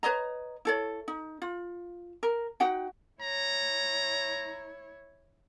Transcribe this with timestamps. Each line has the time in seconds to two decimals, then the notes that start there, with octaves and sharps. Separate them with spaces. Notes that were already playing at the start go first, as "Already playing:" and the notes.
0.03 B4 C#5 D#5 A#5
0.65 E4 A4 C#5
1.08 D#4
1.42 F4
2.23 A#4
2.60 D#4 F#4 F#5 G5
3.22 E4 C#5 A#5